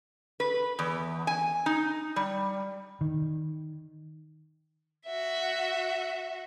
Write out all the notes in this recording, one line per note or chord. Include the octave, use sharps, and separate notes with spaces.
B4
E2
G#5
D#4
G3
D#3
F#4 E5